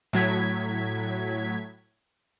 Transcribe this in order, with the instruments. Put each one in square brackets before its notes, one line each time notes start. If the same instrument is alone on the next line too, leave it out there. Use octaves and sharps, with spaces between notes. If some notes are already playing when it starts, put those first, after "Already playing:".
[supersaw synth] A2 F#3 G#6 B6